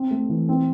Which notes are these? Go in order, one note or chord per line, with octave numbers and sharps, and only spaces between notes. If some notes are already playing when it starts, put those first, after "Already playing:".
Already playing: C4
A3
E3
C4